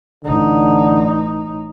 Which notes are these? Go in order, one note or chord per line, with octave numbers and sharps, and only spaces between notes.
A1 D3 D#4